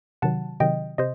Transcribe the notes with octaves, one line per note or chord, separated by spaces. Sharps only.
C3 D#3 F#3 F#5 A5
C3 D#3 F#3 D#5 G5
C3 C5 D#5